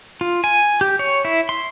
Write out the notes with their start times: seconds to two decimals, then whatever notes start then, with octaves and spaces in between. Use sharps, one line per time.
0.21 F4
0.44 G#5
0.81 G4
0.99 C#5
1.25 E4
1.49 C6